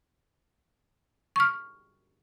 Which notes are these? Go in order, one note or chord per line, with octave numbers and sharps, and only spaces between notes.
C#6 F6